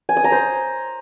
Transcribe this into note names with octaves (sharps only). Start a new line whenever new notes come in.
G#5
D#6
A#5
C5